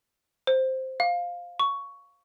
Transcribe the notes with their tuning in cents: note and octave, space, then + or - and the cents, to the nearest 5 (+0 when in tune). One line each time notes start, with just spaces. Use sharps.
C5 +0
F5 +10
C#6 +10